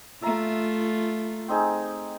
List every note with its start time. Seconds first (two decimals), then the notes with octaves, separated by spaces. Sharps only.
0.22 A3 F4 E5 A#5
1.48 C4 D#4 G#4